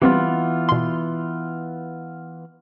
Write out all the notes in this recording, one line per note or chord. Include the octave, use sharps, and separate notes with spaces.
E3 G3 B3 C4 F4 G4
B2 C6